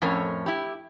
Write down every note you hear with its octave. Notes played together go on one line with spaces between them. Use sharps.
F2 A2 C#4 A#4 C#5
E4 G4